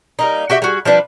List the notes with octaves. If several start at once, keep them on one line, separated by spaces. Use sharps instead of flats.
G3 A#3 D#4
F#4 G4 E5
G3 F#4 G#4
F3 G3 D4 B4